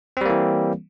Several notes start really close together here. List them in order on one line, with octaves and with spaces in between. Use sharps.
C4 G3 A#3 E3